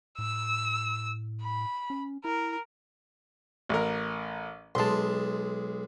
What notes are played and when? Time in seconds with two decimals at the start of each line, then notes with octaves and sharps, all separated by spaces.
0.19 A2 E6
1.42 B5
1.90 C#4
2.25 E4 A#4
3.69 A1 A#4
4.75 B1 G#3 A5 C6